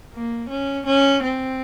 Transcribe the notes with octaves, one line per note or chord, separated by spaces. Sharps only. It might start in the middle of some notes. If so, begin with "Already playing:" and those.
A#3
C#4
C#4
C4